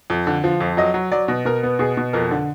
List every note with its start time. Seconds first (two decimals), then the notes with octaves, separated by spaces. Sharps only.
0.10 F2
0.27 D3
0.44 F3
0.61 F2
0.77 F#3 D#5
0.94 F#3
1.12 F#3 D5
1.28 B2
1.45 B2 A#4
1.63 B3
1.79 B2 G#4
1.97 B2
2.13 F2 A#4
2.31 D3